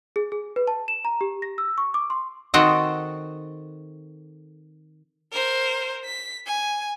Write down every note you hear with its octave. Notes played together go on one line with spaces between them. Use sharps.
G#4
G#4
B4
A5
E7
A#5
G4
A#6
E6
C#6
D6
C6
D#3 C4 F#4 A4 D#5
A#4 C5
B6
G#5